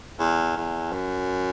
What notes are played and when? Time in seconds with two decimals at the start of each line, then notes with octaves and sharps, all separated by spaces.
0.19 E2
0.56 E2
0.93 F#2